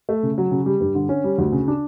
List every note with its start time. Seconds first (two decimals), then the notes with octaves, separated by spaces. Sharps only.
0.09 A3
0.23 C#3
0.38 F#3
0.51 C#3
0.66 G3
0.81 G2
0.95 D3
1.09 C#4
1.24 G3
1.38 D2
1.52 C#3
1.68 D4